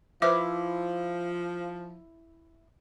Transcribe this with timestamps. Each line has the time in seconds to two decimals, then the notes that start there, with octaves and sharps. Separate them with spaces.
0.22 F3 E4 B4 C5 E5 D6 F6